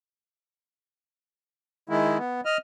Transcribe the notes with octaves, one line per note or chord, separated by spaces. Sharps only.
D#3 G#3 E4
B3
D#5 F6